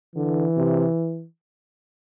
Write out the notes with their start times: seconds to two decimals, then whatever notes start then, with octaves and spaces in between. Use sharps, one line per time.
0.16 D3 E3
0.56 C3